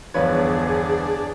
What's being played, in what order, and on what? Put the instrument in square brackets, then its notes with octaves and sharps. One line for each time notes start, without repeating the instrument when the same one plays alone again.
[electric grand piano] G1 E2 G#6 [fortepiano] F3 B4 C#5 [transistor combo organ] D4 [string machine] G#4